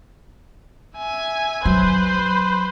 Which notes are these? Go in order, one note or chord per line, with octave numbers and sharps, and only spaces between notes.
E5 G#5
F#3 B4 C5